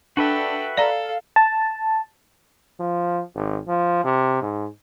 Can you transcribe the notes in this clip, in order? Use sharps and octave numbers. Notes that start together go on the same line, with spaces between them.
D4 F#4 A4 B4 E5 G5
A4 D5 F5 A#5
A5
F3
G#1
F3
C3
G#2